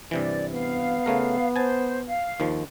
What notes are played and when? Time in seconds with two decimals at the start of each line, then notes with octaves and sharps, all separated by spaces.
0.11 G2 C3 E3 D5
0.54 B3 F5
1.06 C#3 A3 A#4
1.56 C5 G#5 A5
2.07 F5
2.40 D#2 D#3 F3